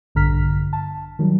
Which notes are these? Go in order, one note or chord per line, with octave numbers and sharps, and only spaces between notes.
A#1 G2 D3 A#5 F6 B6
A5
D#3 F#3 G3